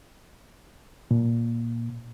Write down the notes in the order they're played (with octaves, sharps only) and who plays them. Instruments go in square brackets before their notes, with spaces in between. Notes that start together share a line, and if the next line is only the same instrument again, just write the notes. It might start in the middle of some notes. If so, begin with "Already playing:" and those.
[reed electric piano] A#2